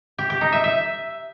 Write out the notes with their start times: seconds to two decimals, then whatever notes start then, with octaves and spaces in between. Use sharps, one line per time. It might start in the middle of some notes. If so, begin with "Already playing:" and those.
0.18 G4
0.30 G4
0.41 D#4
0.52 E5
0.64 E5